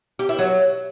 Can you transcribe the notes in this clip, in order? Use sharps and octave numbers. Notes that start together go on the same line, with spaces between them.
G4
E4
F#3